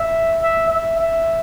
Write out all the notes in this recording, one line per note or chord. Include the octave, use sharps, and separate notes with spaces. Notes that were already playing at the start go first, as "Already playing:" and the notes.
Already playing: E5
E5
E5
E5